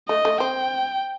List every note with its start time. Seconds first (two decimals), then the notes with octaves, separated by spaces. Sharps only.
0.09 A3 D#5
0.25 A3
0.40 C4 G5